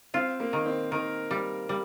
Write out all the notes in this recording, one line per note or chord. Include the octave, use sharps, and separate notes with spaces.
C4 F4
A#3
D#3
C4
D#3 A#4
G3
G3